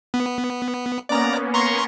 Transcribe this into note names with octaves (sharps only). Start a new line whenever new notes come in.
B3
A#3 B3 C#4 D5 A#5
A#5 C6 C#6